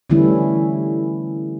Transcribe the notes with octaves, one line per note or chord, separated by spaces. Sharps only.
D3 E3 G3 A3 C#4 E4